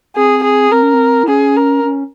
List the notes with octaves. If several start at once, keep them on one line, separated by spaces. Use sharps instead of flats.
C4 G#4
G#4
C4 A#4
C#4
C4
E4
C#4 G#4
A#4
C#4